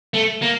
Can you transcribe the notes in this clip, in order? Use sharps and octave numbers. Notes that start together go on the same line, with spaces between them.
A3
A#3